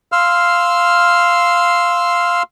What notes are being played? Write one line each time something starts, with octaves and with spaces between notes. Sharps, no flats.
F5 C6 E6 F6